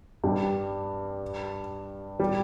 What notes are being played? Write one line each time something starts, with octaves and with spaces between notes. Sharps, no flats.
G2 G3
G3